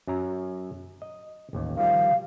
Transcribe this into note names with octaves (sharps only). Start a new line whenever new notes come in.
F#2 F#3 A#5
D#5
A1 D#2
D#3 F3 G3 F5